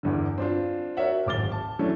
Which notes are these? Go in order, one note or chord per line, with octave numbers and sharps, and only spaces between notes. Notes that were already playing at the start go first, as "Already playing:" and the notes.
E2 G2 D3
C4 D4 F4
F#4 A#4 C#5 D5 E5 F#5
D1 G#1 D6 F6 A6 G7
A5
E3 F#3 A3 C#4 D4